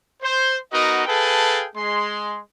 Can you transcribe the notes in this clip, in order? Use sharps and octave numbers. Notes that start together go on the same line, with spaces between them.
C5
B3 D#4 F#4 A#4 D#5
G#4 A4 B4 F5 G5 A5
G#3 C6